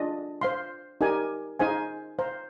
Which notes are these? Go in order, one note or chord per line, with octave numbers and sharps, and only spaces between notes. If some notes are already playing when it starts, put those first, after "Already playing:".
Already playing: D4 F4 G#4 D#5
C5 F5 C6
D#4 G4 A#4 D5 G#5
D#4 G#4 C5 F5 G#5
C5 F5 A#5